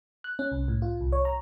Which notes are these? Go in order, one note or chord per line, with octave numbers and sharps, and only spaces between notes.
F#6
C#4
C2
A2
F4
C2
C#5
A#5